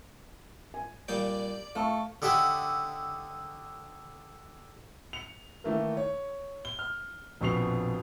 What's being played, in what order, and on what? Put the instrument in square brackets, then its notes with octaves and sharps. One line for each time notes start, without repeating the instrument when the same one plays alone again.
[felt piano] G#5
[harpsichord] A#2 G3 G5 [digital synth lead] D5
[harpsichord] A3 [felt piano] F5 A5 C#6
[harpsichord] D3 D#4 G4 E5 F#5 G#5
[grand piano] C#7 F7
D#3 E3 A3 A#3
C#5
G7
F6
A#1 F2 B2 C#6 C7 F7